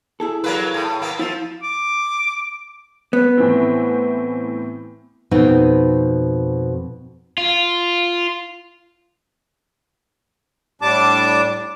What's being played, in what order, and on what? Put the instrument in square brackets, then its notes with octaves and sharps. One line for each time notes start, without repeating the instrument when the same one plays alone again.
[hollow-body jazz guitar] E4 G#4 A4
[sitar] F#3 A#3 B4
A2
A#3 B3
[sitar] F3 [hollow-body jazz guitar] E4 F5
[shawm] D6
[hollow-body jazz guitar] B3
[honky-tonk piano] A2 E3 C4
[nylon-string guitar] F2 B2 C4 D#4 G5
[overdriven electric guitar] F4
[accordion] A2 G3 D4 A5 D6